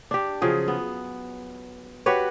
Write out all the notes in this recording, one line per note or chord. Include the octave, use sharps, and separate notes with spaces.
D4 G4
C#3 F3 F#3 G#4
B3
F#4 G4 B4 C#5